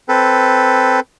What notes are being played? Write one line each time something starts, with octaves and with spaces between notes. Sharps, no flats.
C4 A4 B4